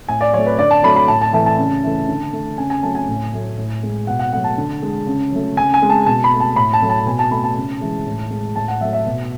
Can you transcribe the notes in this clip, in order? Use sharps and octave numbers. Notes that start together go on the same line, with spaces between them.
A2 G#5
D5
F#3 A3 C#5
B4
D3 D5
A5
F#3 A3 B5
B5
A2 A5
A5
E3 A3 A5
A5
C#3
E3 A3
D3
A3
C#3 G#5
G#5
F#3 A3 A5
G#5
A2
F#3 A3
A2
G#3
B2 F#5
F#5
F#3 A3 F#5
A5
D3
G#3
C#3
F#3 A3
C#3 G#5
G#5
G#3
A5
B2 A5
B5
A3
A5
A2 B5
A5
F#3 A3
A5
B2 G#5
A5
A3 B5
A5
C#3
E3 G#3
A2
G#3
A2 A5
F#5
F#3 A3 E5
E5
B2